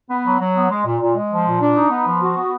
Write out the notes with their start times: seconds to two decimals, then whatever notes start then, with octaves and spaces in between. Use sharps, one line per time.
0.10 B3
0.25 F#3
0.40 F#3
0.55 B3
0.69 G#3
0.85 A#2
1.00 A#2
1.15 G#3
1.30 F3
1.46 A#2
1.61 D4
1.76 D#4
1.90 B3
2.06 F3
2.21 F#4
2.37 B3